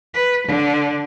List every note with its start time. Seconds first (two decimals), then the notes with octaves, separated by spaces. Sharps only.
0.14 B4
0.47 D3